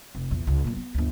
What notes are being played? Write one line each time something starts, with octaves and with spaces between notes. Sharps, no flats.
F1
A#1 E2
C#2
F#2 A#2
B3
G1 D2